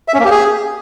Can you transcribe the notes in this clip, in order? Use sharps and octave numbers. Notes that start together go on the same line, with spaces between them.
E5
C#4
A#3
G4
G#4